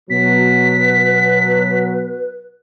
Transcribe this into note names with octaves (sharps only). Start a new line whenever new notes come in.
B2 F#3 B4 B6